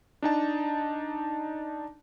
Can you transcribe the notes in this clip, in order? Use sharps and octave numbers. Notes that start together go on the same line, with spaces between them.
D4 D#4 A5